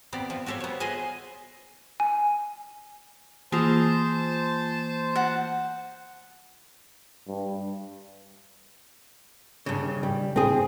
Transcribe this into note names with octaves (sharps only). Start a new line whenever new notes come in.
B3 C4 G4 D5
F3
F#4 G4 A4 C5 C#5
B3 C#5
G#4 B4 C5 D#5 G#5
G#5
E3 A#3 F4 G#4 C5 A5
F#5
G2
G2 C#3
G3
C4 G#4